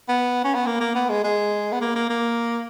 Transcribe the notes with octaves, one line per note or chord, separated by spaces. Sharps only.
B3
C#4
B3
A#3
A#3
B3
G#3
G#3
B3
A#3
A#3
A#3